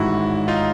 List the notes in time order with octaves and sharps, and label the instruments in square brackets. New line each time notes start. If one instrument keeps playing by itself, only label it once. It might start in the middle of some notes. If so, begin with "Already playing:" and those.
Already playing: [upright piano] A1 G#2 D#3 G3 [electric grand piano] E4 F#4
[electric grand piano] D#4 F4